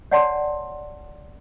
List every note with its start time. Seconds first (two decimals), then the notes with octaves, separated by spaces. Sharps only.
0.11 C#5 D5 F#5 G#5 A5 C6